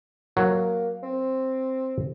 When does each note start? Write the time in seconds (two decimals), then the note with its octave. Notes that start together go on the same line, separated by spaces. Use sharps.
0.37 F#3 A#3
1.03 C4